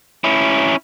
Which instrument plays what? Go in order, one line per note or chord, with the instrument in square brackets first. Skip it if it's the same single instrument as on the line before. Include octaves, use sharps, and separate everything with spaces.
[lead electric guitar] C#4 E4